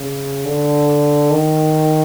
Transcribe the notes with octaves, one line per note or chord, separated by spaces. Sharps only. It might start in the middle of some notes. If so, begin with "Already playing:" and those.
Already playing: C#3
D3
D#3